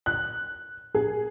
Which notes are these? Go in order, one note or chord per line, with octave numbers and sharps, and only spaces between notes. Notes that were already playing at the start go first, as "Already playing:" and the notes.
F#6
G#4